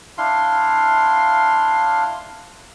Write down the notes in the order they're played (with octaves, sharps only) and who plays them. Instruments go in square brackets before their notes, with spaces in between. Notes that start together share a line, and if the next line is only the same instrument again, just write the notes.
[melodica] D4 E4 F5 C6